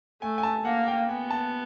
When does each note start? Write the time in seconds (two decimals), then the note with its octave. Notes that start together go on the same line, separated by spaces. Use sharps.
0.22 A3 G#5
0.38 G#5
0.43 A5
0.65 A#3 F#5
0.88 G5
1.08 B3 G#5
1.30 A5